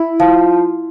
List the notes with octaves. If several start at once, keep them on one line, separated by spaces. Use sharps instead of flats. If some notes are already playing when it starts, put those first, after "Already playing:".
Already playing: E4
F3 F4